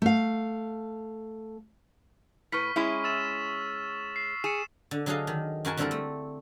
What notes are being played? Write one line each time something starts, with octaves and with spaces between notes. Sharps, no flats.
A3 F5
A2 B4 C#6 F6 B6
G#3 C#4 E4
E6 A6 E7
C7
G#4 C#7 E7
D3
D3 F#3 G#4 A4 D#5 F5
D#3
F#2 F#4 A#4 G#5 A5
D3 G3 C4 E4 A4 A#4
A3